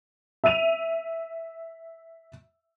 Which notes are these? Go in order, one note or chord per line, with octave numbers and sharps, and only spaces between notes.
E5 E6 D#7 F7